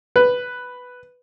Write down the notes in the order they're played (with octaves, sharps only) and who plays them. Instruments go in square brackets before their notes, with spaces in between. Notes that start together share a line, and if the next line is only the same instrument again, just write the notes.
[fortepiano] B4